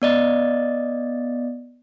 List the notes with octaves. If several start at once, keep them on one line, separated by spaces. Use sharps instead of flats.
B3 D5 D#5